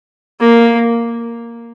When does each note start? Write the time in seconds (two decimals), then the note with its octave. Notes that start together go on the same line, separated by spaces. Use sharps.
0.40 A#3